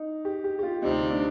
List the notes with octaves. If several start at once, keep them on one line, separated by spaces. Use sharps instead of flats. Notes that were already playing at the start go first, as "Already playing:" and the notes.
Already playing: D#4
G4
G4
G4
F4
D2 C3 G3 D#4
D4